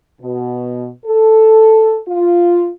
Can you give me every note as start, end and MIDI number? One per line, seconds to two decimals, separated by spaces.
0.22 0.89 47
1.06 2.00 69
2.08 2.68 65